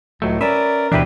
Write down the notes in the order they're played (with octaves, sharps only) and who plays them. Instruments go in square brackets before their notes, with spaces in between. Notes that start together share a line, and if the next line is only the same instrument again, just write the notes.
[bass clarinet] C#2 [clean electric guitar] A2 F#3 A3
[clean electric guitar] C#4 B4 E5 [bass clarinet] A#4 [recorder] D5
[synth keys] D2 B2 E3 [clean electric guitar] D4 G4 B4 [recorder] E5